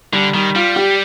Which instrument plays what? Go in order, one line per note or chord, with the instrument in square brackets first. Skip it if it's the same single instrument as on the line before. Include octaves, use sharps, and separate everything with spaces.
[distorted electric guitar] D3 [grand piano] G3
[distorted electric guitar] D#3 [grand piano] G3
[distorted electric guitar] G3 [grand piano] F4
[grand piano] G4